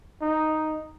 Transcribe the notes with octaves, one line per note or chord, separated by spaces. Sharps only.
D#4